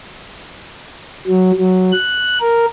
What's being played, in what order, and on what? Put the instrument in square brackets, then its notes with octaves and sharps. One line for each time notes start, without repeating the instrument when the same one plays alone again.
[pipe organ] F#3
F#3
F#6
A#4